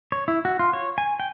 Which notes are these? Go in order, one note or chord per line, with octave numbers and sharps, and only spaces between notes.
C#5
E4
F#4
F4
C#5
G#5
G5